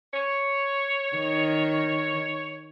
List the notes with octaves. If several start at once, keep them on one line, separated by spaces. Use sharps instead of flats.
C#5
D#3